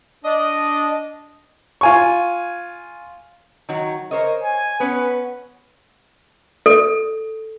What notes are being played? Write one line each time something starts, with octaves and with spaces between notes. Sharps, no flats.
D4 D#5
F4 G#5 C#6
D#3 F#3
A#4 C5 C#5 D#5
G#5
B3 C#4 B4
A4